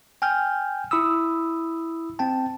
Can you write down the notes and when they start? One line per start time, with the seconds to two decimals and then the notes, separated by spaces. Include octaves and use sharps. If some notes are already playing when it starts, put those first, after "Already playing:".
0.22 G5 G#5 F6 G6
0.91 E4 B5 D#6 E6
2.19 C4 G5 A5